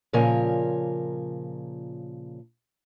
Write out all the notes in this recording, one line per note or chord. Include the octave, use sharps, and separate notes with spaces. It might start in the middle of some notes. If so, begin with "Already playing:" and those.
A#2 C#3 F3 A#4 C#5 G#5